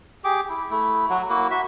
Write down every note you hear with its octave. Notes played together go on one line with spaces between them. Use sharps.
G4 G#4 D6
E4
A3 E4
F#3 F#4
A#3 E4 F#4
F#4 E5